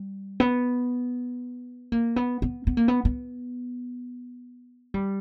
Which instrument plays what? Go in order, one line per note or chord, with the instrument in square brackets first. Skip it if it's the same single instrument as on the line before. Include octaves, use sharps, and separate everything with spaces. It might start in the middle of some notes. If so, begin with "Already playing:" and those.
Already playing: [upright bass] G3
B3
A#3
B3
B3
B3
A#3
B3
B3
G3